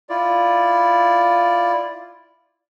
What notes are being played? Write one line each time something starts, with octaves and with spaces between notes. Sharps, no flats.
E4 F4 D5